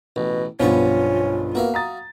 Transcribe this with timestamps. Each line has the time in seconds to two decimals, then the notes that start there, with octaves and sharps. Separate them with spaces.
0.16 A1 B2
0.60 B1 G2 F3 B3 C#4 F4 C#6
1.55 A#3 B3 F#4 E5 F5
1.74 A#5 D#6 A6